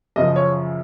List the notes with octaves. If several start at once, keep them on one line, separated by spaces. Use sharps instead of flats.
F#2 C#3 F3 D#5
C#5